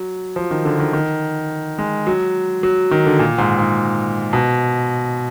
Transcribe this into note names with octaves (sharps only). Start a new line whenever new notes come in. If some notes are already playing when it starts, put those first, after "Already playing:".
Already playing: F#3
F3
D#3
D3
D#3
D#3
G#3
F#3
F#3
D#3
D3
A#2
G#2
G#2
B2